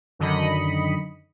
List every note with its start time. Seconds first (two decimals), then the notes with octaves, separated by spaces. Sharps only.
0.19 F#2 D3 D#3 D#5 B5 C#7